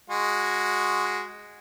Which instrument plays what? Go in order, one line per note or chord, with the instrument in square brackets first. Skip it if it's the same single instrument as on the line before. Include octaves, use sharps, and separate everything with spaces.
[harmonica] G#3 F#4